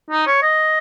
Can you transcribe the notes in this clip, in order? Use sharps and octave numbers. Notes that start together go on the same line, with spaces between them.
D#4
C#5
D#5